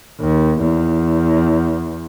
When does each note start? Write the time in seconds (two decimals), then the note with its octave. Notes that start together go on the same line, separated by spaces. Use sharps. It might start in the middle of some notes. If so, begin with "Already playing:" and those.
0.20 D#2
0.60 E2